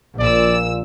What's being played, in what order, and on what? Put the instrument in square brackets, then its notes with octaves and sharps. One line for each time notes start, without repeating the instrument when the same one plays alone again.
[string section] A#1 E6 [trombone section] A#2 [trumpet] D5